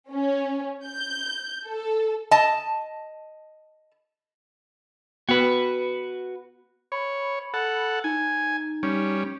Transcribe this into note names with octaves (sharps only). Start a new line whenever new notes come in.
C#4
G6
A4
D#5 A5
B3 F#4 B4
C#5 B5
A4 F#5
D#4 G#5
G3 C#4